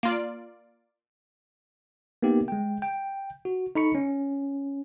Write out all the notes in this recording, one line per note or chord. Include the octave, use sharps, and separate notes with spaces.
A#3 F4 D5
A#3 B3 D#4 G4
G#3 G5
G5
F#4
D#4 A4 B5 C#6 C#7
C#4